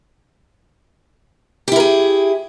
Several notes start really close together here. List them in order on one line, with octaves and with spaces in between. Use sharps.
G4 E4 A#4 G#4